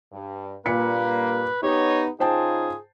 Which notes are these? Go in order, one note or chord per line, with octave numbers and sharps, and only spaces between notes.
G2
G2 A#2 G3 A#3 B4 B6 C#7
B3 D#4 G4 C#5
C#3 D#4 F4 G#4 C5 G5 A5